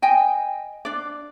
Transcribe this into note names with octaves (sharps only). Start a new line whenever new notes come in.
D#5 G5 G#5
D4 D5